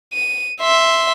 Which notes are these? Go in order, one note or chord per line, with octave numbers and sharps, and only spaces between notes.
D#7
E5 C6